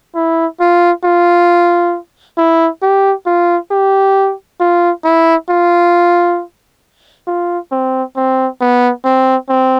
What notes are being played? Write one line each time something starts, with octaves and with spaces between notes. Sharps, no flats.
E4
F4
F4
E4
G4
F4
G4
F4
E4
F4
F4
C4
C4
B3
C4
C4